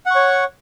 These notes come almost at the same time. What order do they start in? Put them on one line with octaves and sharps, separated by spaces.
F#5 C#6 C#5